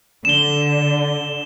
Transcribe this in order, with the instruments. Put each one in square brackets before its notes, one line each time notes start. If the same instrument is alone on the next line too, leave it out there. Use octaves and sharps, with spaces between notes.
[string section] D3 [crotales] E7 G7